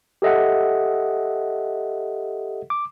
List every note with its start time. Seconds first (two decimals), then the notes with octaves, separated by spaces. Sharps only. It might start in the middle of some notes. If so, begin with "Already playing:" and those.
0.22 G4 A4 D#5 E5 F#5
2.70 D6